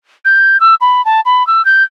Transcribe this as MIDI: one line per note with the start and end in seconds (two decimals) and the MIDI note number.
0.25 0.60 91
0.60 0.75 88
0.81 1.04 83
1.05 1.21 81
1.25 1.46 83
1.47 1.64 88
1.65 1.83 91